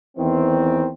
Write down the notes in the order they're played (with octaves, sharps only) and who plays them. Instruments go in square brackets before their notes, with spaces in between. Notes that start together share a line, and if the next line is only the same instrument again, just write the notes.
[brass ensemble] E2 D#3 E3 C4